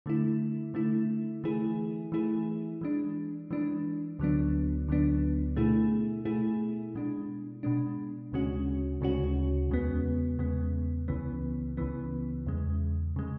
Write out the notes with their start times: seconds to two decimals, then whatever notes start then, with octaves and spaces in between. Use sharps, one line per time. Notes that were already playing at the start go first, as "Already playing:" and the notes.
0.06 D3 A3 E4
0.74 D3 A3 E4
1.44 E3 A3 E4 G#4
2.12 E3 A3 E4 G#4
2.81 E3 G#3 D4
3.51 E3 G#3 D4
4.19 D2 D3 F#3 B3 D4
4.88 D2 D3 F#3 B3 D4
5.56 B2 A3 E4 G#4
6.25 B2 A3 E4 G#4
6.95 B2 G#3 D4
7.63 B2 G#3 D4
8.32 D2 C#3 G#3 C#4 F#4
9.01 D2 C#3 G#3 C#4 F#4
9.70 E2 C#3 G#3 B3
10.39 E2 C#3 G#3 B3
11.08 C#2 C#3 E3 B3
11.77 C#2 C#3 E3 B3
12.46 E2 C#3 G#3
13.16 C#3 G#3